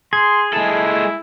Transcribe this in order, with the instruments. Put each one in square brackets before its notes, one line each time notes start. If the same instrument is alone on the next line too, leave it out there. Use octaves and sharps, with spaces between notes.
[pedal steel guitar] G#4 [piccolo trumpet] C6 [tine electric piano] G#6
[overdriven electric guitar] G#3 A4 [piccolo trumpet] E4